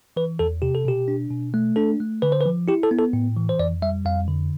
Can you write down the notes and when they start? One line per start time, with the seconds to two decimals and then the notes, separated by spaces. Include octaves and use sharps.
0.16 E3 B4
0.39 E2 A4
0.62 C3 G4
0.75 A4
0.85 B2 G4
1.08 D4
1.30 B2
1.54 A3
1.76 D4 A4
2.00 A3
2.22 D3 B4
2.32 C5
2.41 B4
2.46 F3
2.68 E4 G4
2.83 A4
2.91 B3
2.99 A4
3.13 A2
3.37 E3
3.49 C5
3.59 F2 D5
3.82 G3 E5
4.06 F2 F5
4.28 D3